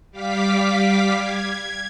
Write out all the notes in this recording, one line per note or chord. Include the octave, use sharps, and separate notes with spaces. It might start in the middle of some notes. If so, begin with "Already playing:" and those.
G3 F5 D6 B6
G#6